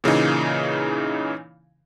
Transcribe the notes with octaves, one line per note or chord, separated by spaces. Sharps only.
A#2 C#3 E3 D#4